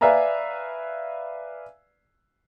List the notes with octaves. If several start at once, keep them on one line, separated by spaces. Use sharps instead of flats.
B4 D5 E5 F5 G#5 A#5